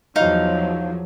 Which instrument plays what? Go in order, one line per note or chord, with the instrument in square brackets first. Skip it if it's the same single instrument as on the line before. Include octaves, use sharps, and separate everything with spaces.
[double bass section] E2 F3 F#3 [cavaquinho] D#4 F5